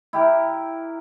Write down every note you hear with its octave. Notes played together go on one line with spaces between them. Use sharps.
E4 G4 A#4